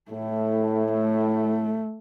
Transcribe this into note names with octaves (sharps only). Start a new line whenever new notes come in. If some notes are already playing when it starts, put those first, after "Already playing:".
A2 A3
A3